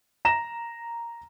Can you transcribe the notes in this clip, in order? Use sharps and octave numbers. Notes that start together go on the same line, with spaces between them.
A#5 A#6 E7